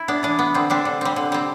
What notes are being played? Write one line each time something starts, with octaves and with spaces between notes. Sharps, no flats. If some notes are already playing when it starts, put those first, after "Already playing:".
Already playing: E4
B3 D4
E3 D4
B3
D3 C4
G3 C4 D4
D3
G3 C4
D3
G3 C4